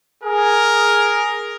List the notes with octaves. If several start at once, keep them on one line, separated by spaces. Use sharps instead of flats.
G#4 A#4